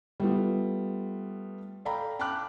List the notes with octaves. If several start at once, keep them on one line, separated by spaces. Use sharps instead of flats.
G3 A3 B3 F4
A4 D5 F5 G5 A#5 B5
G5 A5 B5 D6 F6 F#6